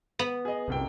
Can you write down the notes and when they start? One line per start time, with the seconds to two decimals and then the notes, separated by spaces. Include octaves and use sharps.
0.19 B3
0.45 G#4 D#5
0.68 D#1 C2 F#2 G5